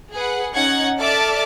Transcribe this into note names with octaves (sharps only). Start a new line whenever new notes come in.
G#4 B4 F#5
C#4 D#4 F#5 G#6
A4 D5 E5 A5 D6 F6